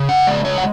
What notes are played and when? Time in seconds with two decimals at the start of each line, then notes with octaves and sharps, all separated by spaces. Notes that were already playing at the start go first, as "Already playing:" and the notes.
Already playing: C#3
0.09 F#5
0.27 G#3 D5
0.45 C#5
0.58 F#5